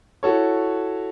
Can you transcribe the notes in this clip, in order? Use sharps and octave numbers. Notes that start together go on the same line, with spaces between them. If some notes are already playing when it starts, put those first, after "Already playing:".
E4 F#4 A4 C#5